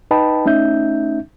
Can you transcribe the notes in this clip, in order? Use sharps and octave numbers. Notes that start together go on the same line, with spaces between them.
D#4 B4 D#5 G5 A5 B5
A3 C#4 D#4 E5 G6